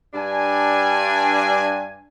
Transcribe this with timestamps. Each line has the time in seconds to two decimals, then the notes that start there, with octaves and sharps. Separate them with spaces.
0.14 G2 D4 G#5